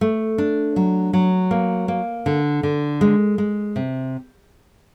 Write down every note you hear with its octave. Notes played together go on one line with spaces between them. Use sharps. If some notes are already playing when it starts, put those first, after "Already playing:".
A3
D4
F#3
F#3
A#3
A#3
D3
D3
G#3
G#3
C3